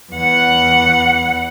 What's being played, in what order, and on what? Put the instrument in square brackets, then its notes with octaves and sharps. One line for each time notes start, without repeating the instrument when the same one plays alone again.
[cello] E2 F#5